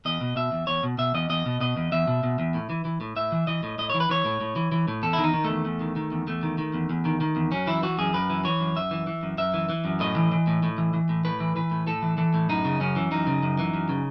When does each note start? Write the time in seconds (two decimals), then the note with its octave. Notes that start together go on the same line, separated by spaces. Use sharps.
0.05 E2 D#5
0.21 B2
0.36 B2 E5
0.52 E2
0.67 E2 C#5
0.83 B2
0.98 B2 E5
1.14 E2 D#5
1.30 E2 D#5
1.46 B2
1.61 B2 D#5
1.76 E2
1.92 E2 E5
2.07 B2
2.23 B2
2.39 E2
2.54 A2
2.70 E3
2.85 E3
3.01 A2
3.16 A2 E5
3.32 E3
3.47 E3 D#5
3.63 A2
3.78 A2 D#5
3.90 E3 C#5
4.00 B4
4.09 E3 C#5
4.25 A2
4.41 A2
4.56 E3
4.72 E3
4.88 A2
5.03 E2 A4
5.13 D#3 E4
5.24 D#4
5.34 D#3
5.44 A3
5.50 E2
5.65 E2
5.81 D#3
5.96 D#3
6.12 E2
6.27 E2 A3
6.43 D#3
6.58 D#3
6.73 E2
6.90 E2
7.05 D#3
7.21 D#3
7.36 E2
7.52 F#2 C#4
7.67 E3 E4
7.83 E3 F#4
7.99 F#2 G#4
8.14 F#2 B4
8.30 E3
8.45 E3 C#5
8.61 F#2
8.76 F#2 E5
8.91 E3
9.07 E3
9.23 F#2
9.38 F#2 E5
9.54 E3
9.69 E3
9.85 F#2
10.00 A2 D#5
10.16 E3
10.32 E3
10.47 A2
10.63 A2
10.78 E3
10.94 E3
11.09 A2
11.25 A2 B4
11.40 E3
11.56 E3 B4
11.71 A2
11.87 A2 A4
12.03 E3
12.18 E3 A4
12.34 A2
12.49 F#2 D#4
12.65 C#3
12.81 F#2 C#4
12.96 E3
13.11 F#2 D#4
13.27 C#3
13.42 F#2
13.59 E3
13.74 F#2
13.89 C#3